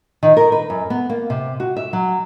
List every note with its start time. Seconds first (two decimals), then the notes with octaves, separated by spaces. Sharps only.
0.23 D#3
0.37 A#4
0.52 B4
0.70 F#2
0.90 B3
1.10 A#3
1.30 C3
1.60 F#4
1.77 E5
1.93 F#3